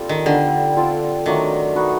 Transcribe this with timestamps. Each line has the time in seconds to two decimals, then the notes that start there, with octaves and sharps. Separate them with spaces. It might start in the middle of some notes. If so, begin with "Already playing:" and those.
Already playing: G3 C4 F4 A4
0.09 D#3
0.26 D3 G3 B3 D#4 G4
0.77 C4 F4 A4 D5
1.26 D#3 F#3 A3 D4
1.76 D#4 F#4 B4